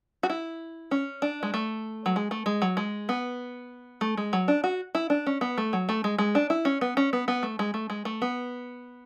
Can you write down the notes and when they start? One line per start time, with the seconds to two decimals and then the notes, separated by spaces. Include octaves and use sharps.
0.23 F#4
0.30 E4
0.91 C#4
1.22 D4
1.43 G#3
1.54 A3
2.06 F#3
2.16 G#3
2.31 A3
2.46 G#3
2.62 F#3
2.77 G#3
3.09 B3
4.01 A3
4.17 G#3
4.33 F#3
4.48 D4
4.64 F#4
4.95 E4
5.10 D4
5.27 C#4
5.41 B3
5.58 A3
5.73 F#3
5.89 A3
6.04 G#3
6.18 G#3
6.35 D4
6.50 E4
6.65 C#4
6.81 B3
6.97 C#4
7.13 B3
7.28 B3
7.43 A3
7.59 G#3
7.74 A3
7.90 G#3
8.05 A3
8.22 B3